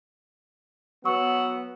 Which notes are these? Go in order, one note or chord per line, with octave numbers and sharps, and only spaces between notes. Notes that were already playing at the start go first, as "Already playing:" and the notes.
F#3 B3 F#5 C#6 E6